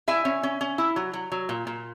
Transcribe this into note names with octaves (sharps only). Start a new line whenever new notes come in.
E4 E5 G#5
C#4
C#4
C#4
E4
F#3
F#3
F#3
A#2
A#2